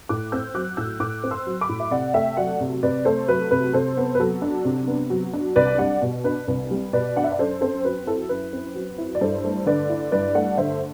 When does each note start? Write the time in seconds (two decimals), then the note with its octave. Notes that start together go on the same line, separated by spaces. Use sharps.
0.09 A2 D6 F#6
0.32 C4 E6 G6
0.55 F#3 D6 F#6
0.77 A2 E6 G6
1.00 A2 D6 F#6
1.24 C4
1.31 C6 E6
1.47 F#3
1.61 B5 D6
1.69 A2
1.80 E5
1.91 C3 D5 F#5
2.14 A3 E5 G5
2.37 F#3 D5 F#5
2.61 C3
2.83 C3 B4 D5
3.05 A3 A4 C5
3.28 F#3 B4
3.51 C3 B4
3.73 C3 A4 C5
3.97 B3
4.15 B4
4.20 F#3 A4
4.42 D4
4.65 C3
4.88 B3
5.10 F#3
5.33 D4
5.56 C2 B4 D5
5.79 G3 D5 F#5
6.02 B2
6.24 D4 B4
6.48 C2 B4
6.71 G3
6.93 B2 B4 D5
7.16 D4 F#5
7.24 E5
7.32 D5
7.39 F#2 A4 C5
7.61 C4 A4 C5
7.85 F#3 B4
8.07 E4 A4
8.29 F#2 B4
8.53 C4
8.75 F#3
8.98 E4
9.15 D5
9.21 G2 A4 C5
9.44 A3
9.66 D3 B4 D5
9.89 E4
10.12 G2 B4 D5
10.35 A3 D5 F#5
10.57 D3 C5 E5